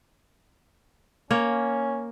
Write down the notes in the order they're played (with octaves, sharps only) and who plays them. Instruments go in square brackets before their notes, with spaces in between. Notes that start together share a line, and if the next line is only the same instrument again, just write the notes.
[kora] A#3 C#5 [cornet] C#4